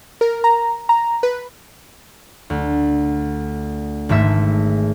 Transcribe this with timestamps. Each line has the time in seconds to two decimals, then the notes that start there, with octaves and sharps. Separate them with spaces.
0.21 A#4
0.44 A#5
0.89 A#5
1.23 B4
2.50 D2
4.09 G#1 G#2 A3 E5